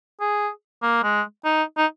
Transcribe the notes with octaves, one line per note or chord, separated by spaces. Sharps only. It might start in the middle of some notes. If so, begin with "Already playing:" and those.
G#4
A#3
G#3
D#4
D#4